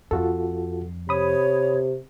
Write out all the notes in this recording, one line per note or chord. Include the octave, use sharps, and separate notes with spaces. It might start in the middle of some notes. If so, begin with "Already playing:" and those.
F2 F4 F#4 A4
C3 C#5 B5 D#6